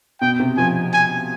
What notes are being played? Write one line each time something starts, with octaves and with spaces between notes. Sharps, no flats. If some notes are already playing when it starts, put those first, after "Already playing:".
B2 G5
C3
F3 G#5
G#5